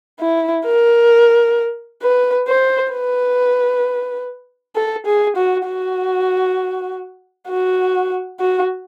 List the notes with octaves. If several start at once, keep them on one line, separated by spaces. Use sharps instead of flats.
E4
A#4
B4
C5
B4
A4
G#4
F#4
F#4
F#4
F#4